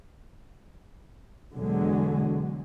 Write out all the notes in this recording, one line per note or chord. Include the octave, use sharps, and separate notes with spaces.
E2 B2 D3 F#3 G#3